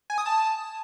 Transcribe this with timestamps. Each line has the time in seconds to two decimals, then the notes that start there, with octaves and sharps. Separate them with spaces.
0.10 G#5
0.18 D#6
0.26 A5